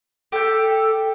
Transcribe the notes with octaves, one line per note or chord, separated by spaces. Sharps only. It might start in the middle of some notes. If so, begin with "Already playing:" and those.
G4 A4 G5